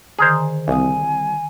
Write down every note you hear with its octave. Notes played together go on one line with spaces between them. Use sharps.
D3 D#3 G#4 A#4 C5
C2 F5 G#5 D#6